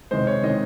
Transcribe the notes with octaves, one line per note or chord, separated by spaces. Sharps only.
C3 D#3 G#3 C5
C#5
C3 D#3 G#3 D#5